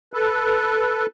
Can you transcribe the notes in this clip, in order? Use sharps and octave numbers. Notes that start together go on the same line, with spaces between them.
A4 B4